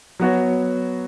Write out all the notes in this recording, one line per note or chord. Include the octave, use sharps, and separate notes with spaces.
F#3 B3 F#4 C#5